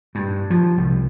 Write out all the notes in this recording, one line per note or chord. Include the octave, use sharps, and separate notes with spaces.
G2
F3
C2